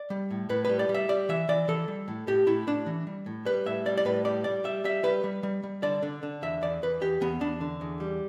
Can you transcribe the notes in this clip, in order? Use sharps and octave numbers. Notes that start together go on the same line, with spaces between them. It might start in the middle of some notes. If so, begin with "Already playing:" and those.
Already playing: D5
G3
A2
A2 B4
G3 B4
D5
G3
E5
G3 D5
E3 E5
E3 D5
E3 A4
G3
A2
A2 G4
A2 E4
A2 D4
E3
G3
A2
G3 B4
A2 E5
G3 D5
D5
A2 B4
G3 D5
G3 D5
G3 E5
G3 E5
G3 B4
G3
G3
G3
D3 D5
D3
D3
E2 E5
E2 D5
E2 B4
E2 G4
E2 B3
E2 D4
D3
E2
G3